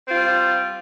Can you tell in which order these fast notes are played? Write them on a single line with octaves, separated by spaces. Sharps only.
C4 F4 G3